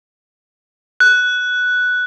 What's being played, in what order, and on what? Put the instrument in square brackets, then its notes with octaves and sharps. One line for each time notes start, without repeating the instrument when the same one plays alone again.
[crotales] F#6